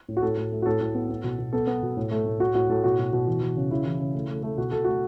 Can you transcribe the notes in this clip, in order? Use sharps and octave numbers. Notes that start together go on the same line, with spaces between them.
A2
F#4
A2 A4
A2
A3
F#4
A2 A4
A2
B3
B3
B2
B2
B3 A4
B3
B2
A2
A3
A2
A2 F#4
A2 F#4
A2 A4
B2 F#4
B2
B2
E3
E3
C#3
C#3 E4
E3
C#3
A3
A3
A3
B2 F#4
B2 A4
A3 F#4